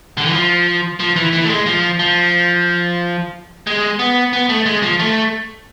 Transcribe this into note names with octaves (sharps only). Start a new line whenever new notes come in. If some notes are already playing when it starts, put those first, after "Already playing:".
D3
E3
F3
F3
E3
E3
A3
G#3
F3
F3
G#3
B3
B3
A3
G#3
F3
A3